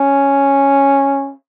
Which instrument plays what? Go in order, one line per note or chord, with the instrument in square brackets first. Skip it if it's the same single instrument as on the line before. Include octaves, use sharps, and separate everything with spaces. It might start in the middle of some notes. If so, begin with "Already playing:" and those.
Already playing: [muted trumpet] C#4